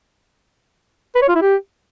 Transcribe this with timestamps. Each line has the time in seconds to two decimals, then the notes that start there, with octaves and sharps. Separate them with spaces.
1.15 B4
1.22 C#5
1.29 F4
1.35 E4
1.42 G4